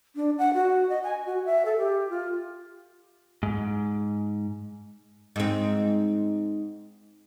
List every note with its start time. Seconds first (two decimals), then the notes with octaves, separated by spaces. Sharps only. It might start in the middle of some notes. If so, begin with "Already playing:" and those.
0.16 D4
0.39 F#5
0.54 F#4
0.89 D#5
1.04 G#5
1.26 F#4
1.46 E5
1.65 A4
1.77 G4
2.10 F4
3.43 G#2
5.36 G#2 C4